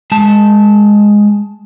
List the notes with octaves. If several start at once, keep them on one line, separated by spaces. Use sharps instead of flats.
G#3 A5